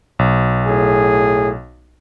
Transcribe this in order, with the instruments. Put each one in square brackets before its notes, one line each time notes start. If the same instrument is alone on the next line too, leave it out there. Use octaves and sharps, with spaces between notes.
[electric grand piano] B1
[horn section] A2 G#4